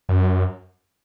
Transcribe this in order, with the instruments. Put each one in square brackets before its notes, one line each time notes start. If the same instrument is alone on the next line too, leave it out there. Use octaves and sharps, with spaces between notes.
[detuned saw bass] F#2